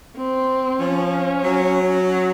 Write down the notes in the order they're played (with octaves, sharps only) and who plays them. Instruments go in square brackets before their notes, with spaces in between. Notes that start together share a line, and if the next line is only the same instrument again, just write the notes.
[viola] C4
[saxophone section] F3 [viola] C#4
[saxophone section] F#3